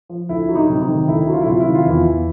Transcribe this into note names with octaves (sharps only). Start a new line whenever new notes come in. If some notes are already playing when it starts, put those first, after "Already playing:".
F3
D2 E4
F#3
D#4
C3
D#4
D#3
D2 E4
F#3
F4
E4
C3 F4
E4
D#3
F4
E2 E4
E2